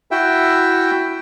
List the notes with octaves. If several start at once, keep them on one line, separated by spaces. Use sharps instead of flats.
E4 F#4 E5 G5